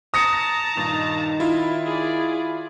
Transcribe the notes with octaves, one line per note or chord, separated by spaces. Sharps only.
A5 A#5 D#6 A#6 C#7
G2 A#2 D#3 D#4
E4 F4
G#4 D5